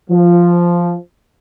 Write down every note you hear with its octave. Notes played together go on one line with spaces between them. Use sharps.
F3